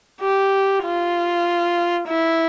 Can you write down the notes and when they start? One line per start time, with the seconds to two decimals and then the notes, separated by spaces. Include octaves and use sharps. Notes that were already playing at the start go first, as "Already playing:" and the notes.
0.21 G4
0.84 F4
2.08 E4